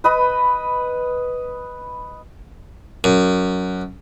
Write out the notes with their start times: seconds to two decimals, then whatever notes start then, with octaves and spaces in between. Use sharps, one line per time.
0.04 B4 D#5 B5
3.04 F#2